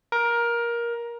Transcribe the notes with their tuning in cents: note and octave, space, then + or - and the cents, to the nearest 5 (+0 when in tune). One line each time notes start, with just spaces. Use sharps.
A#4 +15